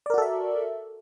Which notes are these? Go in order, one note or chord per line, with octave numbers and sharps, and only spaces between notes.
F#4 A4 A#4 D5 E5